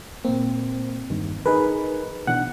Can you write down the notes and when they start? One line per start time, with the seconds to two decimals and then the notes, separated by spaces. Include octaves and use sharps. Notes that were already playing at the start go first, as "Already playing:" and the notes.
0.25 A#2 A#3 C4
1.10 E2 G2 D#3
1.46 D#4 G#4 A#4 B4
2.27 B2 E3 D4 F#5